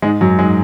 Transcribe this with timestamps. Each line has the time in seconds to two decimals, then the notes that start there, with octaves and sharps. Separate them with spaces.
0.02 G#2 G#3
0.21 F#2 F#3
0.39 G#2 G#3